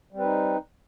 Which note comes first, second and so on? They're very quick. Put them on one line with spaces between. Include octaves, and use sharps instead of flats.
G3 C4 B4 D#4